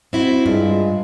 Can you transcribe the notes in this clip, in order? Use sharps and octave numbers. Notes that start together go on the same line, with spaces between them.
C4 E4 F#4
G2 G#3 F4